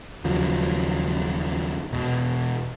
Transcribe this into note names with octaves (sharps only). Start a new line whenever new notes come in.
D#2 C#3 F3 F#3
E1 B2